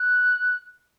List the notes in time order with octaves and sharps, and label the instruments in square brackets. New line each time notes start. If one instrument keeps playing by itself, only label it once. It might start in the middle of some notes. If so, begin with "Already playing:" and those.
Already playing: [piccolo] F#6